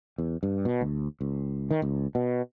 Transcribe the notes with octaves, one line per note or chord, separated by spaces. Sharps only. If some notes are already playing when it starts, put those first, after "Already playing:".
E2
G2
B2
D2
C#2
D#3
C#2
B2